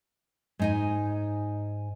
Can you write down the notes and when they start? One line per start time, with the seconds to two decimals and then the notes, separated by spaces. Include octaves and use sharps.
0.59 G#2 D#4 G#5